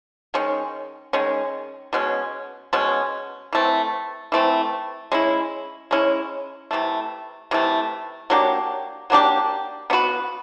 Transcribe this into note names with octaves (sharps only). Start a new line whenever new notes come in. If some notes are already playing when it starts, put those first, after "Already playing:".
D#3 G#3 C#4
D#3 G#3 C#4
B2 G#3 C#4
B2 G#3 C#4
E3 A3 C4
E3 A3 C4
G#3 C#4 E4
G#3 C#4 E4
C3 E3 A3
C3 E3 A3
F#3 A#3 D4 G4
F#3 A#3 D4 G4
B3 D4 F#4 B4